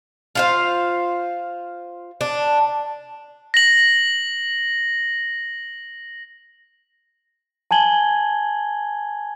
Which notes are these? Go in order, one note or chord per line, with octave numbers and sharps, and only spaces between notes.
F4 C5 F5
D4
A#6 F#7
G#5 A5 G#6 F#7 G7